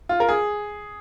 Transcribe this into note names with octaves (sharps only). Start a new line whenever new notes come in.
F4
A#4
G#4